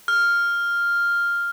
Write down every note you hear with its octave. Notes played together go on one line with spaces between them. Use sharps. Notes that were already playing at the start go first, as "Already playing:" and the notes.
F6